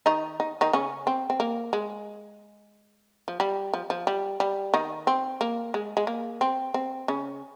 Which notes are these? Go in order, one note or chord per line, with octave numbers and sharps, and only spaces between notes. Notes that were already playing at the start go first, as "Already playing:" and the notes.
D#3 D#4
D#4
D#3 D#4
C#3 C#4
C4
C4
A#3
G#3
F3
G3
F3
F3
G3
G3
D#3 D#4
C4
A#3
G#3
G#3
A#3
C4
C4
C#3 C#4